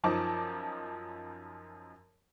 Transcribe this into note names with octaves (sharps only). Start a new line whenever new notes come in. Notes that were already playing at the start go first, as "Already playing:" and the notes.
F#2 F3 D#4 A5 D6 D#6